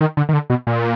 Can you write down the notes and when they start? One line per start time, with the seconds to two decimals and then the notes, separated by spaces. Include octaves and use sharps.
0.01 D#3
0.17 D3
0.29 D#3
0.33 D3
0.50 B2
0.67 A#2